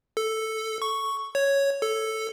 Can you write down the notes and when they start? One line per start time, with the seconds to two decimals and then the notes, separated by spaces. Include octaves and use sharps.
0.17 A4
0.82 C#6
1.35 C#5
1.82 A4